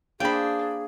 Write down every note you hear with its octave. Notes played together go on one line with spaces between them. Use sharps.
A#3 D4 G#4 C5 G5 B5